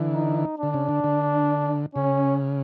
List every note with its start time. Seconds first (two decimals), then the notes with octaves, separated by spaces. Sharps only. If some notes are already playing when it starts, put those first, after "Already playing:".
Already playing: D3 E3
0.13 D#4
0.58 D3 D4
0.74 C#3
0.89 D3
1.04 D3
1.95 C#3 C#4